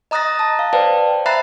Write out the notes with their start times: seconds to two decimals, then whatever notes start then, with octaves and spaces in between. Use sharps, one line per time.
0.11 D#5 A#5 D#6 F#6 A6 A#6
0.39 A5
0.59 F5
0.73 B4 C5 D5 G5 A5
1.26 E5 A#5 B5 F#6 A6 C7